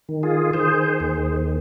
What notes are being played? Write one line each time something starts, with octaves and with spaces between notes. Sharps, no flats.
D#3
F4 G#4
D#3 G#4 C5
D#2